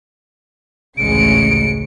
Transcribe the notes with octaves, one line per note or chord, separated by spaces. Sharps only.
A1 D2 C#3 G#3 C#7 D7